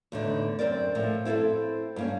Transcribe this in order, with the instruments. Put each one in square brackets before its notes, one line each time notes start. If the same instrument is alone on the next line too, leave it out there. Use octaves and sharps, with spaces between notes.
[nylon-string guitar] E2 A2 D3 D#4
F#2 C4 A#4 D5
A2 F3
C4 E4 F#4 A4 C5
G2 A#3 C#4